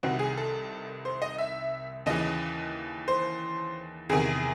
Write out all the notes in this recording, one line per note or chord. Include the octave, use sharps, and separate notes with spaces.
C2 C3 D#3 F#4
G#4
A4
C5
D#5
E5
D#2 C#3 E3 D#5
C5
E2 C3 D#3 G#4